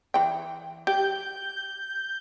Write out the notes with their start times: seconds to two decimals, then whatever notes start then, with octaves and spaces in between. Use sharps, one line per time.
0.14 E3 G5
0.87 G4 G6